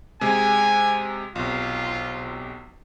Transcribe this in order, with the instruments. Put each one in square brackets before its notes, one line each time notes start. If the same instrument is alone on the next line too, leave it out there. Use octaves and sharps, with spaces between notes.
[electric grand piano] C3 G#3 [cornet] G#5
[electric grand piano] B1 C3 [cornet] F4